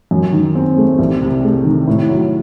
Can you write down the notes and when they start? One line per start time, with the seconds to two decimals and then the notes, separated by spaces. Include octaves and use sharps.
0.11 F#2
0.32 D#3
0.55 C4
0.77 A3
0.99 C2
1.22 C3
1.44 A3
1.65 D#3
1.87 A2
2.09 F#3